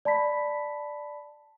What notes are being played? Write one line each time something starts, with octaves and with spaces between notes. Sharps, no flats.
D5 A5 B5 B6